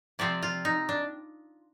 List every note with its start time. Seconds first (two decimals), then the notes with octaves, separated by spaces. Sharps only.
0.19 C3 F3 C4 D5
0.42 F4
0.65 D#4
0.89 D4